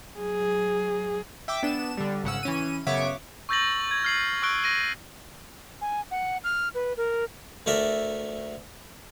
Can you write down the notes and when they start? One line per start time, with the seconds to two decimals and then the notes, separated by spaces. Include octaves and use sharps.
0.16 F#3 G#4
1.48 E5 G5 D6
1.63 B3 D4 E7
1.97 D3 G3
2.23 G#1 C#3 F#5 E6
2.43 E3 C#4 D#7
2.87 F#2 C#3 B3 C#5 E5 D6
3.49 C#6 E6 G6 A6 A#6 F#7
3.91 G#6
4.04 F6 C7 F#7
4.42 C#6 E6 F#6 D7 G7
4.64 A#6 D7 D#7
5.81 G#5
6.11 F#5
6.44 F6
6.74 B4
6.97 A#4
7.66 D2 A3 A#4 D5 E5